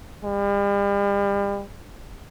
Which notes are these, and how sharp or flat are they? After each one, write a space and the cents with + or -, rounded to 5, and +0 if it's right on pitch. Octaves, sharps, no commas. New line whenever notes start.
G3 +40